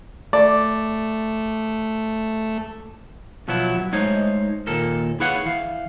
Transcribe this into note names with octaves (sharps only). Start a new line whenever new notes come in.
A3 D5
B2 F3 F#3 B3 E4
F#3
G#3 A3 D#4 C5 C#5
D#2 A#2 A4 A#4
E4 G#4 B4 C#5 F5 F#5
E3 F5